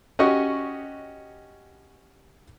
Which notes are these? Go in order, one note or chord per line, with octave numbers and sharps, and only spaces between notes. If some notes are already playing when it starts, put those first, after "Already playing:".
C#4 F#4 G4 D#5 C#6